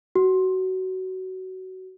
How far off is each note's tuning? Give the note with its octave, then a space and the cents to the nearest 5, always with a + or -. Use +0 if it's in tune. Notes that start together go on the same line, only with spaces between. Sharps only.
F#4 +20